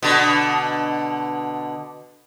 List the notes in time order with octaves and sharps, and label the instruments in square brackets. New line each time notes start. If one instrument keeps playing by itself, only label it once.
[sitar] B2 D3